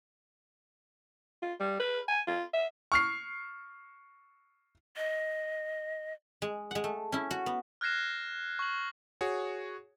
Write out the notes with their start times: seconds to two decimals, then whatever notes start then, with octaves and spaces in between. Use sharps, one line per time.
1.42 F4
1.60 G3
1.80 B4
2.08 G#5
2.27 F4
2.54 E5
2.92 C#6 F6 C7
4.97 D#5
6.42 G#3
6.71 G#3 F#5
6.84 A3
7.12 C#4 E4
7.31 F#4
7.46 B3
7.81 F6 F#6 G#6 A#6 C7 E7
8.59 C#6 F#7
9.21 F#4 G#4 C#5